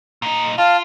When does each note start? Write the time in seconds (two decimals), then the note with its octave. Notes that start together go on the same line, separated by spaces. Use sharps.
0.22 A#2 D#4
0.58 F4 F5 A5